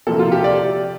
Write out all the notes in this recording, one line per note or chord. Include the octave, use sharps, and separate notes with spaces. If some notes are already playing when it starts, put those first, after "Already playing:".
C3 F3 A#3 A4
F4
G4
D5